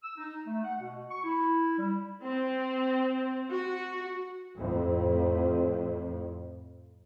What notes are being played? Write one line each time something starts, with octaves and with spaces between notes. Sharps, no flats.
E6
D#4
A3
F#5
B2
C#6
E4
G3
C4
F#4
F2 A2